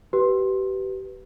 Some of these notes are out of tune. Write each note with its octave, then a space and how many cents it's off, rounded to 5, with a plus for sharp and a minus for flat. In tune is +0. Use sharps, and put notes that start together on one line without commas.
G4 -30 B4 +0